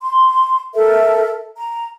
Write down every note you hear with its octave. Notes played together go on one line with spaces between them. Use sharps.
C6
A4 A#4 E5
A#5